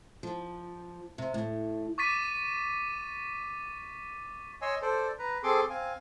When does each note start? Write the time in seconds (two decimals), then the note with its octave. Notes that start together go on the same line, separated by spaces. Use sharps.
0.23 F3
1.18 C3
1.34 A2
1.98 C#6 D6 A6 B6 D#7
4.62 C#5 D#5 G#5 C6 E6
4.82 A4 C5 D5
5.19 B4 A#5
5.43 C4 G#4 A4 C6 D6
5.70 C4 F5 G#5